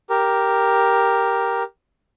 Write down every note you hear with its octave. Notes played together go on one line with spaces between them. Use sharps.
G4 A#4